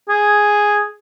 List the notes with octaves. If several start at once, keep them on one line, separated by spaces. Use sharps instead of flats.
G#4